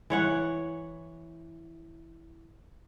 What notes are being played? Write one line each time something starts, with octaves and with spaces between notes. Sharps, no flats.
E3 C#5 F#5